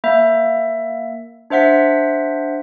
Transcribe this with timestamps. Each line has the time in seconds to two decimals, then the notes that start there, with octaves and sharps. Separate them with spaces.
0.04 A#3 E5
1.50 D4 C5 E5 F#5 B6